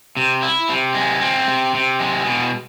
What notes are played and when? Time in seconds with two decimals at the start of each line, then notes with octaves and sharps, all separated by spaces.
0.17 C3
0.42 E4
0.69 C3
0.95 G#3
1.21 C4
1.48 C3
1.75 C3
2.00 G#3
2.27 B2